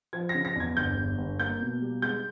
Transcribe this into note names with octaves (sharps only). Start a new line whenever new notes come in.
F3 G#6
A#6
C#3
A#6
E2 G#6
G1 G6
G1
G1
A#3 G6
B2
G3
G#3 G6